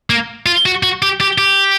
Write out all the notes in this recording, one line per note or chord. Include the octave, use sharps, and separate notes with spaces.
A#3
F4
F#4
F#4
G4
G4
G4